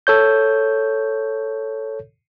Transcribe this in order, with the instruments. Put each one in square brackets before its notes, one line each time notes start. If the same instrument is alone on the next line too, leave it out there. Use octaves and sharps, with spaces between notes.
[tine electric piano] A4 C#5 G6